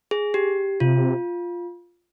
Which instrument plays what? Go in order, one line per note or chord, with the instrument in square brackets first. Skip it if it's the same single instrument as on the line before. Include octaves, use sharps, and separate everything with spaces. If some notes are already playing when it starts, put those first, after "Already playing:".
[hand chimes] G#4
G4
[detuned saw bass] C3 [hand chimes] F4